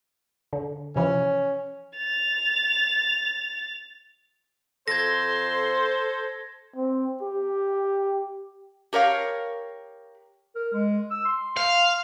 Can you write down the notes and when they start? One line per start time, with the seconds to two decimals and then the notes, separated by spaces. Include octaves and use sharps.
0.53 D3
0.96 C3 E3 F3 C#4
1.97 A6 F7
4.88 F2 A4 C5 C6 G#6 A#6
6.76 C4
7.22 G4
8.93 G4 A#4 C#5 F5
10.55 A#4
10.73 G#3
11.11 E6
11.25 C6
11.57 F5